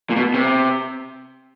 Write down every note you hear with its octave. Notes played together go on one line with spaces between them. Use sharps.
A#2
B2
C3